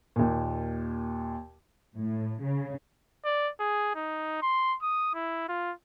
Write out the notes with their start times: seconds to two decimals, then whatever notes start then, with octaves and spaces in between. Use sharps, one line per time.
0.16 D#2 A#2
1.96 A2
2.42 C#3
3.25 D5
3.60 G#4
3.96 D#4
4.42 C6
4.82 D#6
5.14 E4
5.48 F4